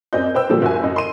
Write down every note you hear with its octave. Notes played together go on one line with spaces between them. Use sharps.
F#2 C4 D5 D#5 G6
B4 C5 G5 E6
A#2 D3 F3 G3 A#3
F#1 F#4 G#5
F#2 D#5
C6 D#7